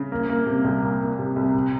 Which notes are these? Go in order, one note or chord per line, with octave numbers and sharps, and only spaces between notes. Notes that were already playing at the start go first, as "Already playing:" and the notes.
Already playing: C#3
A#3
A#3
C3
C2
A#3
A#3
C3
C2
C3